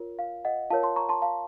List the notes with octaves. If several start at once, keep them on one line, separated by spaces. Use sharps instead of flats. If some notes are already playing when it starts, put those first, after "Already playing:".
Already playing: F4 A#4 C#5
F5
D#5 F#5
F4 A#4 C#5 F5 A5
A5 C6
A#5 C#6
A5 C6
F5 A5